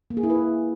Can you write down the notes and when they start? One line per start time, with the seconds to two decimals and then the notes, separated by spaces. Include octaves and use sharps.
0.10 A#3
0.17 G#4
0.23 E4
0.30 B4